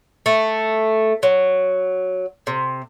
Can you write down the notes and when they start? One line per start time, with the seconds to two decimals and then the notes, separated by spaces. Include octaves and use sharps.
0.26 A3
1.23 F#3
2.47 C3